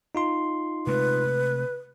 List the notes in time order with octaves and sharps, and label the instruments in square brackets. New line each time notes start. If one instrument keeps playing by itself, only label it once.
[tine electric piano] D#4 F4 C6
[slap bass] C3 G#3 A3 [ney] B4